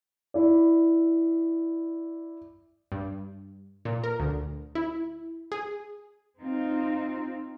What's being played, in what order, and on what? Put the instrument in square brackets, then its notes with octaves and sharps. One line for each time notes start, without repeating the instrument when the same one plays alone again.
[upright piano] E4 D5
[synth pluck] G2
A#2
A#4
D2
E4
G#4
[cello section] C4 D#4 F4